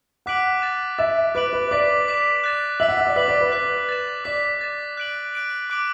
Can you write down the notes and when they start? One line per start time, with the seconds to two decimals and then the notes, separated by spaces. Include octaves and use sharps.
0.26 F#5 D6 F#6 B6 D7 F#7
0.62 A6 E7
0.98 E5 A6 E7
1.35 B4 D6 F#6 D7 F#7
1.53 B4
1.71 D5 D6 B6 F#7
2.07 D6 B6 E7
2.44 F#6 A6 E7
2.80 E5 E6 B6 F#7
2.89 F#5
2.97 E5
3.07 D5
3.16 B4 D6 B6 F#7
3.28 D5
3.41 B4
3.52 F#6 B6 F#7
3.89 A6 E7
4.24 D5 D6 B6 E7
4.61 A6 E7
4.97 F#6 D7 F#7
5.34 F#6 D7 F#7
5.70 D6 F#6 D7 F#7